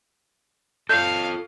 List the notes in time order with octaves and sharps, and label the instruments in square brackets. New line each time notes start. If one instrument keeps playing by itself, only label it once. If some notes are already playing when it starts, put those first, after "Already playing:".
[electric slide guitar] F4 A4 [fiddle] F5 [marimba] G6